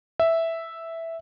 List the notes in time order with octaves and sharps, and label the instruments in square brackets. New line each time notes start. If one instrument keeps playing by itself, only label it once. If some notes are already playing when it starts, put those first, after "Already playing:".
[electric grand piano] E5